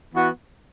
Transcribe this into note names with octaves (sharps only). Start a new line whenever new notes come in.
E3 B3 F#4